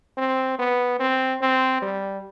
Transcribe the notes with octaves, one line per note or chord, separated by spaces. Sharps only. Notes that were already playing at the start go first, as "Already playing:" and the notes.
C4
B3
C4
C4
G3